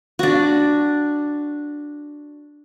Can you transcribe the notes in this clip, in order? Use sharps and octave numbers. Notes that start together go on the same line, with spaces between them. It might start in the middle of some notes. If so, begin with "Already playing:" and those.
D4 F#4